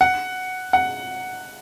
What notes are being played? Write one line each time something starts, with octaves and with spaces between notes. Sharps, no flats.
F#5
F#5